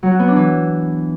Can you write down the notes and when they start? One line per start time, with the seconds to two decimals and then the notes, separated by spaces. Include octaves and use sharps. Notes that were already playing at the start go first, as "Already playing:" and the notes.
0.03 F#3
0.11 F#4
0.19 B3
0.28 D4
0.36 E3